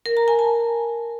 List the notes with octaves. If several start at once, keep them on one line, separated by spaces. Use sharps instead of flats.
A#4
A#5
G#5
A5